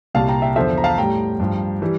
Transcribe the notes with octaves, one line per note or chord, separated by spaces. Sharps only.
C2 A#2 G3 F5 A5
G5 A#5
E5 G5
E2 D3 F3 C5 E5
A#5
F5 A5
A2 G3 G5 A#5
G2 F3
E3 G3